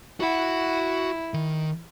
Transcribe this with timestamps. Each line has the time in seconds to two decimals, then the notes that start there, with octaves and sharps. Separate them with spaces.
0.20 E4 F#4 F#5
1.34 D#3